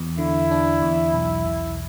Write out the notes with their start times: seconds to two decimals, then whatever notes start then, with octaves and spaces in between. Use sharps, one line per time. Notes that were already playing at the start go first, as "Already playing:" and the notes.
Already playing: E2
0.18 D3 E4
0.51 D4
0.82 E2
1.14 B1
1.47 B1